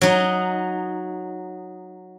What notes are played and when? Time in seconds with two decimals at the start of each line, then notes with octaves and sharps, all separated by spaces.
0.01 F#3 D#4